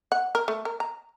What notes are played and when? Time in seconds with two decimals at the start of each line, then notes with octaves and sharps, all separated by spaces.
0.12 F#5
0.35 A#4
0.48 A3
0.65 A#4
0.80 A#5